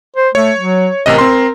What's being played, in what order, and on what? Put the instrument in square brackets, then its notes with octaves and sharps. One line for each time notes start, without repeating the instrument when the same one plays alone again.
[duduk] C5
[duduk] A3 [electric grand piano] C#5
[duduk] F#3
[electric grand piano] A1 C3 D#5 [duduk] A#4
[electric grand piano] C4 C6